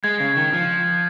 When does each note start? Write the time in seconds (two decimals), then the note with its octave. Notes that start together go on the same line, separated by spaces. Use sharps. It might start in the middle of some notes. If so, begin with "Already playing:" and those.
0.04 G#3 G#6
0.20 C#3
0.37 D#3
0.53 F3